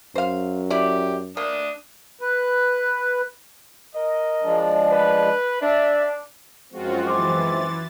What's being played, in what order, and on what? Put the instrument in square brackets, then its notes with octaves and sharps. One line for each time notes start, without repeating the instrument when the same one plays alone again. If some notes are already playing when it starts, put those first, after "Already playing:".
[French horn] F#2 [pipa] C5 F5
[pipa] E4 D5 [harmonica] G4
[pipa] A#3 [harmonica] D4 D#6
[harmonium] B4
[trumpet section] A#4 D#5
[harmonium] F3 G#3 D4
[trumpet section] B4
[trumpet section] D4 [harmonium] D5 E5
[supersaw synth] F#2 F4 F#4 [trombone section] F3 G#3 C4
[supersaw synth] E3 A6 [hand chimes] C6 D6